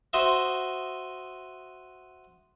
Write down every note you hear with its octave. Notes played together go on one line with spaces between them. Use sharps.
F#4 C5 D#5 E5